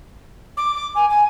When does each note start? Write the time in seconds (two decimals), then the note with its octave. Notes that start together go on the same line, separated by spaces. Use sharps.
0.57 D6
0.75 D6
0.95 G#5
1.10 G#5